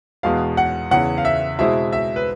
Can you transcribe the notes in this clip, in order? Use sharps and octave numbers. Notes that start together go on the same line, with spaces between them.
E2 B2 G#3 B3 F5
F#5
E2 C#3 E3 F#5
F5
E5
B2 G#3 C4 E4 E5
E5
B4